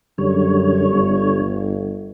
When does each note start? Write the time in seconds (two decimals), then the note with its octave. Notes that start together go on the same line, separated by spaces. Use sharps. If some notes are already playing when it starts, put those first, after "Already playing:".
0.18 F#2 D3 G3 C#5
0.89 G1